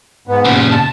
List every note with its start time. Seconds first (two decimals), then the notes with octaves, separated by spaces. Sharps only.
0.27 G#2 B3
0.45 A#2 C#3
0.70 A5